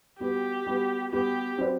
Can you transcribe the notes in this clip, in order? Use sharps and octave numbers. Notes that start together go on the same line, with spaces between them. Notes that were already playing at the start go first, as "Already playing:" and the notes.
G3 B3 F#4 G4 B4
G3 B3 F#4 B4
G3 B3 F#4 G4 B4
F#3 C4 F#4 B4 D5